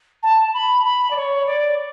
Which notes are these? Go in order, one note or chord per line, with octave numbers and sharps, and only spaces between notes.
A5
B5
B5
D5
C#5
D5